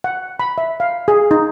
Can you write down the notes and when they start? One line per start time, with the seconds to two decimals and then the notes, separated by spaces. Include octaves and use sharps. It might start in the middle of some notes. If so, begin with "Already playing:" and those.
0.04 F#5
0.40 B5
0.58 E5
0.80 F5
1.08 G#4
1.31 D#4